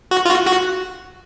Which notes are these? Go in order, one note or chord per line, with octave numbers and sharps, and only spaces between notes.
F#4
F4
F#4
F#4